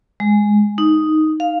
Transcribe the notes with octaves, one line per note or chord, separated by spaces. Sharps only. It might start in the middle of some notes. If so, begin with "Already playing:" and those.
G#3
D#4
F5